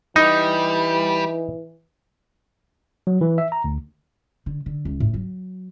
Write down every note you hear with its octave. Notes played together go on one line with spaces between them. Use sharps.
E3 G3 D#4
F#3
E3
E5
A#5
D2
D3
D3
C#2
A2
F#3